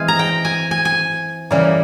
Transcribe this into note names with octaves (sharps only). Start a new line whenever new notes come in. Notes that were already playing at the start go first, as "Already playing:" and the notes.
Already playing: E3 G#3 C4 F5 G#5
A#5
G5
G#5
G#5
G#5
C#3 E3 G3 A#3